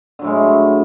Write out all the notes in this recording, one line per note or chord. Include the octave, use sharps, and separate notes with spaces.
A2 D3 F#3 G#3